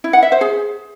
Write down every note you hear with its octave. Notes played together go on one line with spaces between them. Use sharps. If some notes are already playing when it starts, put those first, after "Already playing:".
E4
F#5
E5
C5
G#4